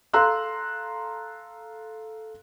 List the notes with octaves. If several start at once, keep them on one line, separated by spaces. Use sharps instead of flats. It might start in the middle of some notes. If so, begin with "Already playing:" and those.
A4 F5 A#5 C6 E6 F#6